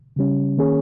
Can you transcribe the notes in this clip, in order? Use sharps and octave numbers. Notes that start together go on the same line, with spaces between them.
C#3 G3 C#4
D#3 A#3 C#4 G#4 C#5